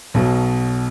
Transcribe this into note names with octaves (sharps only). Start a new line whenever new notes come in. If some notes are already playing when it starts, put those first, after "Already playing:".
B1 B2 F#3